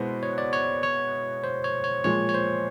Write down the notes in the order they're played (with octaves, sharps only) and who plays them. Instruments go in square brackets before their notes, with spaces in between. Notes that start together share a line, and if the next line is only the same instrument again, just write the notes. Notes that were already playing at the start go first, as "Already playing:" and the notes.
Already playing: [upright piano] B2 G#3 B3 E4 [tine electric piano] C5
[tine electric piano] C#5
D5
C#5
C#5
C5
C#5
C#5
[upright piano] A#2 F3 G#3 [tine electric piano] C#5
[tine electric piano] C#5
C5